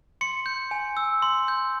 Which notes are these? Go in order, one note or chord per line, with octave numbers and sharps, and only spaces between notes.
C6 C#7
G6
G#5
E6
C6
G6